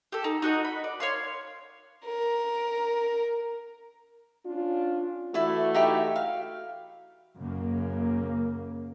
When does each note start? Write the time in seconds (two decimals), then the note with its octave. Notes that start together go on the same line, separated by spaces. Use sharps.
0.12 G4 A4
0.24 D#4
0.42 D#4 F#4 D#5
0.65 B5
0.84 D5
1.00 C#5 F5 C6
2.05 A#4
4.46 C#4 D4 F4
5.34 E3 A3 E4 F#4 D5
5.74 D#4 E4 G4
6.16 F5
7.37 F#2 C#3 A#3